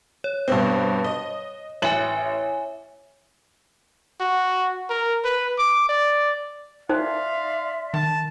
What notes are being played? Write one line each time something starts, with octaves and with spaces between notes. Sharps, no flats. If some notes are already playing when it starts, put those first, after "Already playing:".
C#5
G2 B2 C4
D#5
A1 C#5 E5 G#5 F#7
F#4
A#4
B4
D6
D5
D#4 C5 D5 E5 F5 C6
D#3 A5